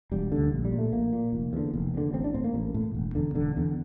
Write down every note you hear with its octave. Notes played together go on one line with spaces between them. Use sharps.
E1 G3
D2 D3
A#1
G3
A#2
A3
A#1 A#3
A#2
F1
E2 D3
F1
E2 D3
A1 C4
D4
A2 C4
A#3
A1
A2
E1
E2 D3
E1 D3
E2 D3